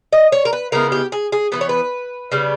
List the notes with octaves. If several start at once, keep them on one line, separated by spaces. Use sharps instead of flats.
D#5
C#5
A#4
B4
C#3 G#3 B3 E4 A#4
G4
G#4
G#4
E3 G#3 B3 B4
C#5
B4
C#3 G3 B3